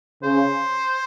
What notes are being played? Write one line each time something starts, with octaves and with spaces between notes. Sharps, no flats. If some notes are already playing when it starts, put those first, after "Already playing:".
C#3 C5